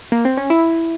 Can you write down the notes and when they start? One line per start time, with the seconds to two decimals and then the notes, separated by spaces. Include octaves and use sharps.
0.12 A#3
0.25 C4
0.37 C#4
0.50 E4